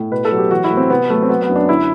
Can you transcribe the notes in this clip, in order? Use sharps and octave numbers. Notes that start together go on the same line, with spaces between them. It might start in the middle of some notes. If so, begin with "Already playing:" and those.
Already playing: A2
B2 B4
A4
F#3
G4
E3 F#4
E4
A2
C4
C3 B3
F#3 A3
C4
F#3 B3
B3
F#2
D4
D3 E4